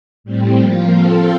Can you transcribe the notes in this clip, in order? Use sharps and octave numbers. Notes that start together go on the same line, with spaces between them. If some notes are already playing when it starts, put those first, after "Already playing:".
A2 G3 C4
F3 A#3 F4
F3 C4 F4 A4